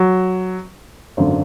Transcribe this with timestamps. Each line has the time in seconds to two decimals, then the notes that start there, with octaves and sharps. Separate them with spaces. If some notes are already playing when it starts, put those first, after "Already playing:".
Already playing: F#3
1.17 G#1 F#2 D3